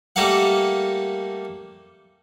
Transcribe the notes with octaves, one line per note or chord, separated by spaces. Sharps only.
G3 A3 A#3 A#4 F5 F#5